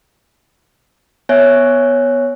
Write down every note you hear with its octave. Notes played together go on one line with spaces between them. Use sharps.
B3 C#5 E5 G#5 F#6